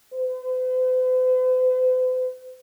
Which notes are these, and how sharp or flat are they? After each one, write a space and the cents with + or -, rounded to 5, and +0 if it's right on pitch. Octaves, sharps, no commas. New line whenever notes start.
C5 -45